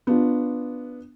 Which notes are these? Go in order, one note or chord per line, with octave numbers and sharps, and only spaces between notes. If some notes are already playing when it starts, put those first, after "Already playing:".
B3 D4 F4